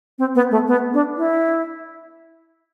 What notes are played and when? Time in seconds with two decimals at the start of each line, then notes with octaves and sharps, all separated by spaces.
0.19 C4
0.35 B3
0.51 A3
0.67 B3
0.94 D4
1.17 E4